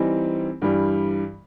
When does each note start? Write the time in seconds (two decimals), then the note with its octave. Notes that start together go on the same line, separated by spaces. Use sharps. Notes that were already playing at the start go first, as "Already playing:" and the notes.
Already playing: E3 G3 C4 D#4
0.62 G2 E3 G3